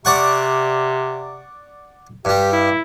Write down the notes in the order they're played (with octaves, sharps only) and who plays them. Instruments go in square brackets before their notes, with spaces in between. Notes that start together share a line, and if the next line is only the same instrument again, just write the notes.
[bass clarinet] C3 [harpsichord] D5 F#5 C#6
[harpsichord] G2 G3 [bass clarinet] G4
[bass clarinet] E4